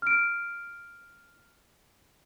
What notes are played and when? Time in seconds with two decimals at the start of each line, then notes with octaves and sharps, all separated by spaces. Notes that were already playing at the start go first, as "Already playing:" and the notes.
0.02 F6 D7